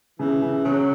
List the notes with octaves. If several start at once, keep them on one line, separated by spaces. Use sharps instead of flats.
C#3 E3
C#3
C#3 F#3